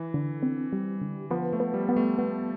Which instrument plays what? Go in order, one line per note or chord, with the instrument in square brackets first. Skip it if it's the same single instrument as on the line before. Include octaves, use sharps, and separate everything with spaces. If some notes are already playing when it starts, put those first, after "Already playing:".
Already playing: [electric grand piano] E3
[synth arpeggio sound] D3
C4
G3
D3
[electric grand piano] F3 [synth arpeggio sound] B3
[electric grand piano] A3
[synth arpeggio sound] B3
[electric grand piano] G3
[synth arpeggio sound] B3
[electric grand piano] A3
[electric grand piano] A3 [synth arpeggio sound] B3